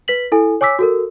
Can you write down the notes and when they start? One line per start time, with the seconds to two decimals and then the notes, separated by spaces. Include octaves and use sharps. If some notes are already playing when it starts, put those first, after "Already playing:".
0.08 B4 B6 F#7
0.32 E4 A4 G#5
0.61 C#5 G#5 D6 E6 B6
0.79 F#4 A4 A#4